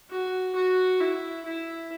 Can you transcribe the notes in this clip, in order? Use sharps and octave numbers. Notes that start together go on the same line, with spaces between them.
F#4
F#4
E4
E4